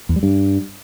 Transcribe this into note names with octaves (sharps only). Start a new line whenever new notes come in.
E2
G3
G2